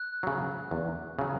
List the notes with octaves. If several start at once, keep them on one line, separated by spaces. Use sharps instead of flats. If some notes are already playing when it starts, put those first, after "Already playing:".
Already playing: F#6
C#3 F#3
E2
C#3 F#3